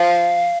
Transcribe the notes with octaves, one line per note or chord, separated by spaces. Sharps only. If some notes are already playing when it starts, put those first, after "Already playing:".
Already playing: F3 F5